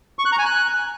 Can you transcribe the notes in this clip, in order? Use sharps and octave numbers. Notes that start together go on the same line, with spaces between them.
C#6
F#6
A#5
G#5
F#6